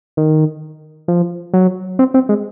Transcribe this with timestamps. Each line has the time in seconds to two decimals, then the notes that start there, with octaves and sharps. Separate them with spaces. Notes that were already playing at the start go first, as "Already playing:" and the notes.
0.17 D#3
1.08 F3
1.53 F#3
1.99 C4
2.14 C4
2.29 G#3